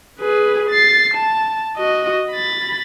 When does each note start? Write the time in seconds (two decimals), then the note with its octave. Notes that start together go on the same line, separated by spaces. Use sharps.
0.20 G#4 B4
0.70 A6 C7
1.14 A5
1.77 F#4 D#5
2.31 B5 A6